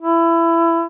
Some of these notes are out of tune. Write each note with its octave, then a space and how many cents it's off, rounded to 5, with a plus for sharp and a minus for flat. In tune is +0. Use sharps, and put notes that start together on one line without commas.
E4 +20